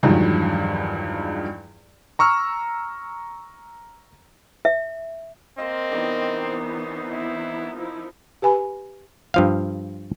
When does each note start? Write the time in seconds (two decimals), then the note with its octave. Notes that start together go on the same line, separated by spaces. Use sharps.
0.03 E2 G2 D#3 F3 F#3 G#3
2.19 A#5 C#6 E6 F6
4.65 E5
5.58 A#3 C4 C5 D#5 F5
5.92 C3 D#3 E3 B3 D4 D#4
6.43 C5
7.12 E4
7.75 F3 D#4 E4
8.42 G4 B4 G#5 B5
9.34 G2 F3 F5